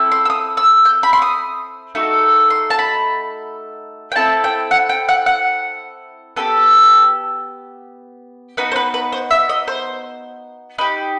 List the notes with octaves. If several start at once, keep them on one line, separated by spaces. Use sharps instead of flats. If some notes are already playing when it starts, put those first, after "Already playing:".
Already playing: C4 E4 A4
C6
E6
D#6
E6
G6
B5
C6
D#6
A3 D#4 F#4 A4
C6
A5
B5
G5
C4 E4 A4 A5
G5
F#5
G5
F#5
F#5
B3 E4 G4 A4
B3 D#4 F#4 B4
C5
B4
B4
C5
E5
D#5
C5
D#4 G4 B4